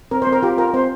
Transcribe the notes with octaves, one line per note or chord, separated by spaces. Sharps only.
C4 A#4
C4 C5
A#4
F4 G4
F4 A#4
C4 C5